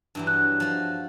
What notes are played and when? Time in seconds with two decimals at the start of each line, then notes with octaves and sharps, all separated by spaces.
0.15 G2 E3 F#3
0.27 F#6
0.60 F3 F#4